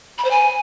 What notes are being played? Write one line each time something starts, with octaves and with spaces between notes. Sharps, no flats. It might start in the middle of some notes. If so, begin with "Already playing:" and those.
B5
C5
G#5